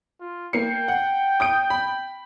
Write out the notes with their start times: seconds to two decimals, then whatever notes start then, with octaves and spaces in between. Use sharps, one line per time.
0.20 F4
0.53 A#3 G5 C7 C#7
0.88 F#5
1.40 D#6 G6 D7
1.70 B5